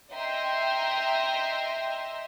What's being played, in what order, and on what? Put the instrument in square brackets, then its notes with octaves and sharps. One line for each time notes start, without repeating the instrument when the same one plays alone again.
[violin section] D#5 E5 G5 A#5 C6